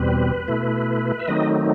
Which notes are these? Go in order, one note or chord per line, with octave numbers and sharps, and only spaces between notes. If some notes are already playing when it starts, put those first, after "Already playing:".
Already playing: E2 B2 G3 C4 B4
B2 A3 E4
E5
D#3 F#3 A3 C4 D#4 D#5